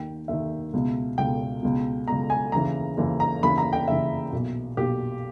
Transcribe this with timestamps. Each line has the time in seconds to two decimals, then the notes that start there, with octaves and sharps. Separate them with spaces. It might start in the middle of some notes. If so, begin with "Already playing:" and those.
Already playing: D#2 D#3 G5
0.28 D#2 D#3 E5
0.73 C#2 B2
1.18 C#2 B2 G5
1.63 C#2 B2
2.08 C#2 B2 A#5
2.30 G#5
2.52 D#2 C#3 E3 A#5
2.97 D#2 C#3 E3
3.20 A#5
3.43 D#2 C#3 E3 B5
3.58 A#5
3.73 G5
3.88 D#2 C#3 E3 E5
4.33 B1 A#2
4.77 B1 A#2 G4